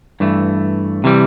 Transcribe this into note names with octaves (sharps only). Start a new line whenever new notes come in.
G2 E3 A3
C3 E3 G3